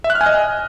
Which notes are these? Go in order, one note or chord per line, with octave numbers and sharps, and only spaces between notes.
E5
F#6
F6
G#5
D#5